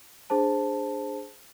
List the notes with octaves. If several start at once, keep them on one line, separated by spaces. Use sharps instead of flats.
D4 G#4 C5 A5